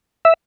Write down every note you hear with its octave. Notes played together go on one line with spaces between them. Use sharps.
E5